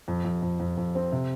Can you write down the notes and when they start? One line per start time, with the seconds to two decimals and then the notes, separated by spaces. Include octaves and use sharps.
0.08 F2
0.25 F2
0.42 F2
0.60 F2
0.77 F2
0.95 C4
1.12 C3